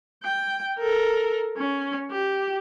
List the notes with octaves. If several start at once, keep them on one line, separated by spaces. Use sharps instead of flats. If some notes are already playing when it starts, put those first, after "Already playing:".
G5
A4 A#4
C#4
G4